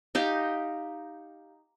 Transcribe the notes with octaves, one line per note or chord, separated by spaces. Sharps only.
D#4 G4 F5